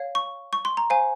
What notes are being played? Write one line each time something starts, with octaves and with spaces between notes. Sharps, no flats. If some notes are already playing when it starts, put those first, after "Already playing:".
Already playing: C#5 F5
C#6
C#6
C6
A#5
C5 F5 G#5